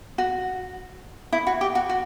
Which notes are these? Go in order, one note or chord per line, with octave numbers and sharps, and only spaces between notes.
F#4
E4
F#4
G4
F#4
F#4